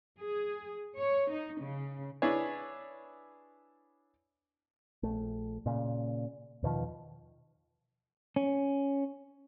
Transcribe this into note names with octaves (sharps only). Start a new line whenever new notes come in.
G#4
C#5
D#4
C#3
D4 E4 G#4 B4 C#5
A#1 A3
A#2 C#3
E2 B2 D#3 F3
C#4